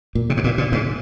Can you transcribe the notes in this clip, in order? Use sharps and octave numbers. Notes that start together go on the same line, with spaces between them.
A#2
C3
G#2
A#2
A#2
G#2